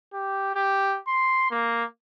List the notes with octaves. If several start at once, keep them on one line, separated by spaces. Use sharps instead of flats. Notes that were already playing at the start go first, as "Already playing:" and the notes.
G4
G4
C6
A#3